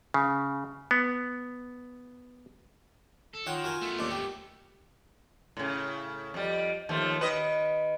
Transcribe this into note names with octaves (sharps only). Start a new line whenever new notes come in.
C#3
B3
A4
D#3 F4 C#5 F#5 G5
F#4 A#4 G#5
A3 B3
D#2 D4
G4
A2 C#3
F2 G3
D#2 F3 A3
D#3 B4 D#5